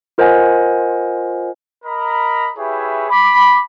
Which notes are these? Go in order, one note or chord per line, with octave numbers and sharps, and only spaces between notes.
F4 A#4 C5 D#5 F#5 G#5
A#4 D#5 A#5 B5
E4 G4 G#4 B4 C#5 E5
B5 D6